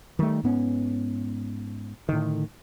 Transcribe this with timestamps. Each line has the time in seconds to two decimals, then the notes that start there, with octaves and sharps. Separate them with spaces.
0.19 D#3 E3 G3 A3
0.43 G#2 B3 C#4
2.09 A2 D3 D#3